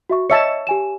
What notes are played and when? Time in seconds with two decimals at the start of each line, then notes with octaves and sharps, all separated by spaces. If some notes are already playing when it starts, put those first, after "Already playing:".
0.10 F#4 E5 C#6
0.30 C#5 D#5 E5 A5 C#7
0.67 G4 G#5 E7